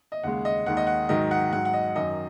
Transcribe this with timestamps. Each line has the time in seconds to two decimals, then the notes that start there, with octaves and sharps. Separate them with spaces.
0.12 D#5
0.23 D#2 C#3 G#3 F#5
0.45 D#5
0.66 D#2 D#3 G#3 F#5
0.77 D#5
0.87 F#5
1.09 G#2 D#3 F#3 D#5
1.31 F#5
1.52 G#2 F#3 F#5
1.65 F#5
1.74 D#5
1.95 F#2 D#3 F#3 D#5